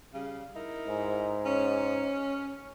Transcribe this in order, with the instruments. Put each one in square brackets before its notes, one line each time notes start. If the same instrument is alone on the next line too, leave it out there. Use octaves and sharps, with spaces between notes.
[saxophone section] C#3 G3 F5
D#4 E4 A#4
[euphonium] G#2
[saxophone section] C#4